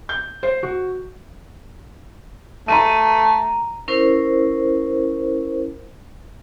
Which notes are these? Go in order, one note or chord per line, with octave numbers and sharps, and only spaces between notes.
G6
C5
F#4
A3 A#5 D#7
C#4 E4 A#4 C5